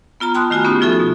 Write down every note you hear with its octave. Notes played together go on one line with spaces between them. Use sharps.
B3 F4 A#5 F6
G5 A5 B5 C6 D#6 F#6
D#3 A3 F4 F#4 G#5 F6
B3 C#4 D#4 G4
F3 F4 F#4 A4 E5
B2